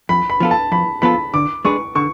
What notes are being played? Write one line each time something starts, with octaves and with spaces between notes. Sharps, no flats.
F2 B5
B5
F3 B3 F4 A4
A5
F2 B5
F3 B3 F4 A4 B5
D3 D6
G#3 D4 G#4 B4 C#6
D3 C#6